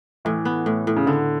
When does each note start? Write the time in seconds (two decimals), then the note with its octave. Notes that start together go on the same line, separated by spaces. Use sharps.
0.25 A2 E3
0.45 B3
0.66 A2
0.87 A2
0.96 C#3
1.07 D3 B3